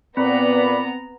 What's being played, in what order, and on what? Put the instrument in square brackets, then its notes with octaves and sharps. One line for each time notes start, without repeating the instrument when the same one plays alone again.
[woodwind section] A#2 B5 [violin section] B3 A#5 [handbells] C4 [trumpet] D5